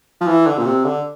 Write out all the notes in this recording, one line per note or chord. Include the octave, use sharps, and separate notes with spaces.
F3
E3
D3
A#2
C3
D3